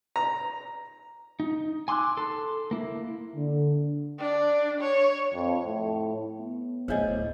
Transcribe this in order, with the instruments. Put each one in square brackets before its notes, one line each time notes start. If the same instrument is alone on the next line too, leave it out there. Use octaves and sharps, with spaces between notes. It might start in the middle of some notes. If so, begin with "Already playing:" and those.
[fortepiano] A#5
[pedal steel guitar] D#4
G#5 C6 D6 E6 F#6
A4 C6
A#3 E4
[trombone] D3
[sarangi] D4
C#5
[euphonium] F2
A2
[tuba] B3
[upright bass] D1 A#1 [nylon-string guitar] E4 G#4 [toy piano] C5 C#5 D#5